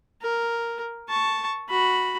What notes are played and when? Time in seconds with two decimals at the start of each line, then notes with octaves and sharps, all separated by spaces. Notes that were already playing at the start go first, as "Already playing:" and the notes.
0.21 A#4
1.09 A5 C#6
1.69 F#4 B5